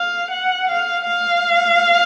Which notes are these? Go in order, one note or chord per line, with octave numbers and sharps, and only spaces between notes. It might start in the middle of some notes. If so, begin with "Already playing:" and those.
Already playing: F5
F#5
F5
F5